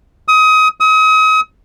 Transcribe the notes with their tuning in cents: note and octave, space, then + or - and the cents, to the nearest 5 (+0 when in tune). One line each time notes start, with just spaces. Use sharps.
D#6 +25
D#6 +35